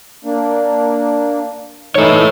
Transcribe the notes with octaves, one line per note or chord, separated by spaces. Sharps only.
A#3 D4
E3 A3 D#4 A4 C#5